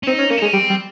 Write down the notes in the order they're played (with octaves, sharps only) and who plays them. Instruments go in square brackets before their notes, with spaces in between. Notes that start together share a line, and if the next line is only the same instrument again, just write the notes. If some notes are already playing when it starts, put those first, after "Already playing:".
[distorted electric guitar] C#4
[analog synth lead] C4 [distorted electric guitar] D#4
[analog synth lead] C#4
[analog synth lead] A#3 [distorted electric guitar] C#4
[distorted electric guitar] D#4
[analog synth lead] G#3
[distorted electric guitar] C#4
[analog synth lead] G3 [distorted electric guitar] C4
[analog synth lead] G3